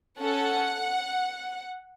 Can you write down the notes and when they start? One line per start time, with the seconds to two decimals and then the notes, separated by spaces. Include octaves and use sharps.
0.20 C#4 A4 F#5